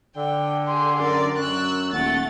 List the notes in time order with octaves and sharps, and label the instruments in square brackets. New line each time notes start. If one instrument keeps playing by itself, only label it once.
[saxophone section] D3 [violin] G5
[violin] G4 G#4 [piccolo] C6
[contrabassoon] F#2 [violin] A#4 D5
[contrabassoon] F#2 [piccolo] C#6 [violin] E6 F#6
[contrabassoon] D#1 [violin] A3 A6 [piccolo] F#5